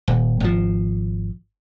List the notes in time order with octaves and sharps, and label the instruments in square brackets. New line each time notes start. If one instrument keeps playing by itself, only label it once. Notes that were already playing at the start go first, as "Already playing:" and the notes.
[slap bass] D#1
G#1 F3